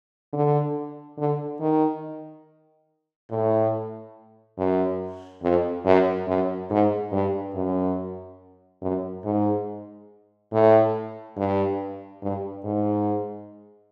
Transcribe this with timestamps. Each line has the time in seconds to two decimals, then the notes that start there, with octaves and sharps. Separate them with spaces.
0.33 D3
1.18 D3
1.60 D#3
3.30 A2
4.58 F#2
5.42 F2
5.85 F#2
6.28 F#2
6.70 G#2
7.12 G2
7.55 F#2
8.82 F#2
9.24 G#2
10.52 A2
11.37 G2
12.22 G2
12.64 G#2